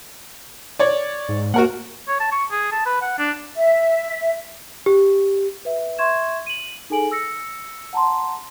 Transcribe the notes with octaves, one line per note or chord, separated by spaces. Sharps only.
C#5 D5
G#2
A#3 F#4 A#4 F#5
C#5
A5
C#6
G#4
A5
B4
F#5
D4
E5
G4
B4 E5
E5 C6 C#6 G#6 E7
D#7 F#7
D#4 G#4 A4 G#5 D7 F#7
E6 A#6 C#7
F#5 A5 A#5 C6